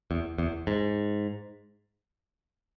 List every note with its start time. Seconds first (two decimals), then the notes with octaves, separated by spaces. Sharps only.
0.11 E2
0.38 E2
0.67 G#2